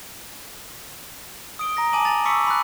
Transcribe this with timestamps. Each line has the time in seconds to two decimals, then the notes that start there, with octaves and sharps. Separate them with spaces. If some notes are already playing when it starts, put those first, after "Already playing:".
1.59 D#6 D7 G7
1.77 A#5 A#6
1.93 G#5 A5 D6 D#7 F#7
2.05 G#5 A6 F7
2.25 C#6 D6 E6 B6 C#7
2.47 B5 D6 F#6